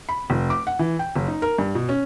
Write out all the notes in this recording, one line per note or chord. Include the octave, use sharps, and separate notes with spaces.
B5
F1
D6
F#5
E3
G5
F#1
D#4
A#4
G2
B2
C#4